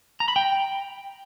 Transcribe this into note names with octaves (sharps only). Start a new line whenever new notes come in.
A#5
B5
G5